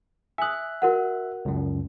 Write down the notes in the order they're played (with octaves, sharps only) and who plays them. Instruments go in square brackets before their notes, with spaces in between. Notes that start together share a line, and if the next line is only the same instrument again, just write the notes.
[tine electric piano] E5 F#6 [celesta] G#5 D#6
[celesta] F#4 A#4 F#5
[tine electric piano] C#2 F#2